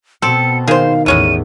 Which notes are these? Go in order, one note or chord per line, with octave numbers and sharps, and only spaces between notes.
B2 C4 A4 C#7
D#3 G#4 C5 F5
A1 E2 G#3 C#4 E4 D#7